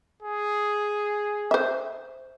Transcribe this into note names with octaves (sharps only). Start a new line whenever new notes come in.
G#4
C5 E5